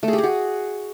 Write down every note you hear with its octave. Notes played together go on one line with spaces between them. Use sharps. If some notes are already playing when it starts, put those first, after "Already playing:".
A3
G#4
G4
G#4
F#4